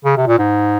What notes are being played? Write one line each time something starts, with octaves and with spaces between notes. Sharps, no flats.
C#3
C3
A#2
G#2